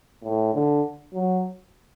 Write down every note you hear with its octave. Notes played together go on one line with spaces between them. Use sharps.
A2
D3
F#3